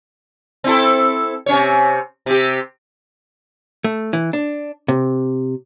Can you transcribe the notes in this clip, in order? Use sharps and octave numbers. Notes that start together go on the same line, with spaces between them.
C4 E4 A4
C3 C#4 C#5
C3 G4
A3
E3
D4
C3